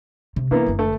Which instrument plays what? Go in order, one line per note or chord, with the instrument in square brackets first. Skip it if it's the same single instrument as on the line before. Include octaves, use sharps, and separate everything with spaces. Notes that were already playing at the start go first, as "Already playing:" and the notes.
[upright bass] C3
[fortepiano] E3 A#3 B3 [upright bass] C#4
[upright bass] F#1 D3
[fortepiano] A3